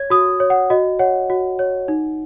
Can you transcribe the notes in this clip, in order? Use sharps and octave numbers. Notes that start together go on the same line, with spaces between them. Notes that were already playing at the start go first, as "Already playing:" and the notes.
Already playing: C#5 G#6
F#4 D#6
C#5
F#5
F#4 D#5
C#5 F#5
F#4
C#5
D#4